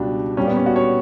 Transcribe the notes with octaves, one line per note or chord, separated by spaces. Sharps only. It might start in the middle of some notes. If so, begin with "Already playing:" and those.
Already playing: C#2 B2 G3 D4
A#2 G3 C#4
B3
C#4
F#4
C#5